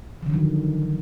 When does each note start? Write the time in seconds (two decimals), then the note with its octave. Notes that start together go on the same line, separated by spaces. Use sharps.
0.23 F3
0.26 D3
0.30 F#3
0.34 D#3